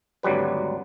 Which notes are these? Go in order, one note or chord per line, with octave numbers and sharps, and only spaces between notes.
G#1 D2 F#3 G3 B4